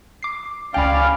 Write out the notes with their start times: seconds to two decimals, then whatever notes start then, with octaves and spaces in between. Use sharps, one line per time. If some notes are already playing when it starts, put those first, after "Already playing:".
0.23 D6 C7
0.74 C#2 C#4 D5 F5 G5 G#5 B5